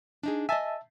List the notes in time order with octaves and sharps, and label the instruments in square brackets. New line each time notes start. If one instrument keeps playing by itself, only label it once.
[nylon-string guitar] D4 D#4 G#4
[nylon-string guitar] D#5 G#5 [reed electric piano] E5 A5